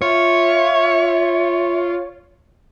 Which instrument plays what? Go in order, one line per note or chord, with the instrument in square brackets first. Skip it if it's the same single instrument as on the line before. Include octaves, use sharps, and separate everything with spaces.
[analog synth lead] F4 [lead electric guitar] C#5 [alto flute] E5